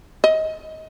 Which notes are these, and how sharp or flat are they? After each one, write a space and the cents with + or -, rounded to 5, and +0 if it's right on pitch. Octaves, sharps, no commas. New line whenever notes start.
D#5 +20